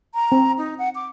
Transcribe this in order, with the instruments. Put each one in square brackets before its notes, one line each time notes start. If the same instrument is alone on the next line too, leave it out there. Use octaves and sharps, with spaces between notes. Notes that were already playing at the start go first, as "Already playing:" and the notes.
[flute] A#5
[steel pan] C4
[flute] D#4
F#5
D6